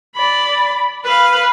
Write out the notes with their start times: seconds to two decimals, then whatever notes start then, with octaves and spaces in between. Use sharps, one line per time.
0.16 D5 B5
1.05 B4 F5